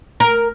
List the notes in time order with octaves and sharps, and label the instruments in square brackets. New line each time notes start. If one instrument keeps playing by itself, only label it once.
[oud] A#4